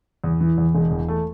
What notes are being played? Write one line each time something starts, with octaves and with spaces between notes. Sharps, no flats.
E2
E3
E2
E1
E2
A3